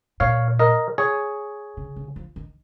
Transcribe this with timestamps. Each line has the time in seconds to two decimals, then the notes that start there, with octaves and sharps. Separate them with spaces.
0.20 A#2 C#5 F5
0.59 A#4 D#5
0.98 G#4 C#5
1.77 C#3
1.96 C#3
2.16 F3
2.36 D#3